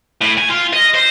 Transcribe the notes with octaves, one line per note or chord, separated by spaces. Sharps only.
A2
G#5
F4
D#5
C5